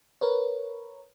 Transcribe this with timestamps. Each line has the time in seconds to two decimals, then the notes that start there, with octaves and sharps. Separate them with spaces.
0.21 A#4 B4 C#5